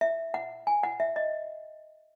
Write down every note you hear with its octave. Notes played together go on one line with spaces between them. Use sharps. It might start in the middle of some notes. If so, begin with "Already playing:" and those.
E5
F#5
G#5
F#5
E5
D#5